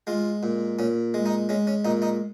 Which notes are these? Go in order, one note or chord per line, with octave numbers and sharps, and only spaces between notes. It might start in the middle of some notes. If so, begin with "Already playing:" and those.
G#3 F4
A#2
A#2 C#4
G#3
D#4
G#3 C#4
C#4
A#2 D#4
D#4